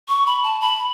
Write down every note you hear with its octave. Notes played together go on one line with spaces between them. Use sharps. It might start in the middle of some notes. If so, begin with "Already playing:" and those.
C#6
B5
A5
B5